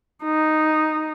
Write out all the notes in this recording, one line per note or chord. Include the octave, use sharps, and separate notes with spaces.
D#4